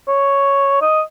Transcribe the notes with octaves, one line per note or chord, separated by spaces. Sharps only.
C#5
D#5